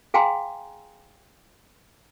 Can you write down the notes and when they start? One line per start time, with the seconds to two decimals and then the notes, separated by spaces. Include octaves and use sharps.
0.14 G#4 F5 G5 G#5 A#5 C6